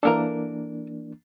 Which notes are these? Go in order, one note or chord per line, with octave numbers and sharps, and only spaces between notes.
E3 A#3 D4 A4 A#4 A#5